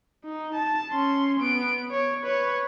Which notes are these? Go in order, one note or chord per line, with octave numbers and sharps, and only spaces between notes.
D#4
A5
C#4 C6
B3 D7
C#5
B4 C#5